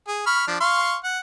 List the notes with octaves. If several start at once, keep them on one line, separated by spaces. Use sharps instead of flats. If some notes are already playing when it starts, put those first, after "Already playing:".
G#4
B5 C#6 F6
F3 D4
F5 C6 C#6
F#5